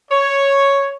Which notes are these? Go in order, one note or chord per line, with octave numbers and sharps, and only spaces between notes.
C#5